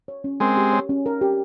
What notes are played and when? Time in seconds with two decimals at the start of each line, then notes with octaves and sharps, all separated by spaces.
0.08 C#5
0.24 C#4
0.40 G#3 C4 A#4
0.57 G4
0.73 C#5
0.89 C#4
1.06 A#4
1.21 G4